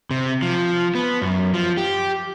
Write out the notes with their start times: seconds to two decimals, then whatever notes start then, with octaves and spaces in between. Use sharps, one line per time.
0.11 C3
0.42 F3
0.95 B3
1.22 F#2
1.53 F3
1.77 G4